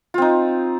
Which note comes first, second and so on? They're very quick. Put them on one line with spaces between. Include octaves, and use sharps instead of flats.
F4 C4 D#4